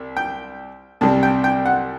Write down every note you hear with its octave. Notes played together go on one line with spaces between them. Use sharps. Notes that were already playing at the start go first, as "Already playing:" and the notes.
Already playing: C2
G5
C2 C3 G3 A5
G5
G5
F#5